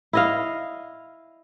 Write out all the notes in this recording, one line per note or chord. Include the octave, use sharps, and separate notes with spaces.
E4 D#5 F5